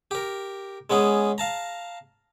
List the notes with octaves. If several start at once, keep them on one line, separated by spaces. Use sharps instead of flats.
G4 A#4
G#3 B3 C#4 G#4
F5 A5 A#5